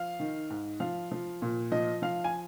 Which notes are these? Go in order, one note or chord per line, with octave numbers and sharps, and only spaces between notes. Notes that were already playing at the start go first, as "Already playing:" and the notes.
Already playing: F3 F5
D#3
G#2
F3 F5
F3
A#2
F3 D#5
F3 F5
G#5